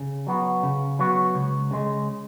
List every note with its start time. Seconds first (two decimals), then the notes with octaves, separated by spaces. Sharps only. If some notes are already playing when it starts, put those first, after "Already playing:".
Already playing: C#3
0.27 F#3 B3 F#4
0.63 C#3
0.99 F#3 B3 F#4
1.35 C#2
1.71 C#3 G#3